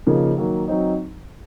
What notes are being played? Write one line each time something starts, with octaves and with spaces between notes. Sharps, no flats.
C#3 F3 A#3 D#4 G#4
D#3 F#3 A#3
F#3 C4 D#4